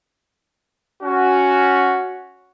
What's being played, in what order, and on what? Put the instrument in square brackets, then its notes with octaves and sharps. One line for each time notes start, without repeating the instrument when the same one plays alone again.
[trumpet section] C#4 F#4